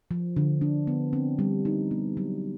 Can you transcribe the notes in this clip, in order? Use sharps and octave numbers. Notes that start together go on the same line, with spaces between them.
F3
D3
D4
B3
C4
G3
D#4
B3
F#3